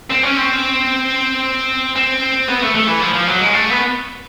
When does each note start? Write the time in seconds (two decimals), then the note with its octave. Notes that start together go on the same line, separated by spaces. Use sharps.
0.10 C4
0.23 C#4
0.37 C4
1.96 C4
2.48 B3
2.62 A3
2.75 A3
2.87 E3
3.01 F3
3.13 F3
3.27 F#3
3.40 G#3
3.54 A3
3.70 B3